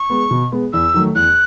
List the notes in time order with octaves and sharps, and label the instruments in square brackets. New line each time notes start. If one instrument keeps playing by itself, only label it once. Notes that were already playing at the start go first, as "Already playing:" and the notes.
Already playing: [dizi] C#6
[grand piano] G#3 B3
B2
G#3 B3
[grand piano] E2 [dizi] E6
[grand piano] D#3 F#3 A3
[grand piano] E2 [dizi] F#6